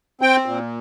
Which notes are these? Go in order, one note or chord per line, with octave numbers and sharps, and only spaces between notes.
C4 G5
A#2